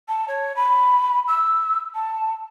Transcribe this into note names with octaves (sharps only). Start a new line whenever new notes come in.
A5
C#5
B5
E6
A5